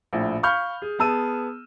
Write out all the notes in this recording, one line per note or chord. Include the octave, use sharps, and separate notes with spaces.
A#1 A2
F5 B5 C#6 F6 G6
G#4
B3 G#4 A5 E6 D#7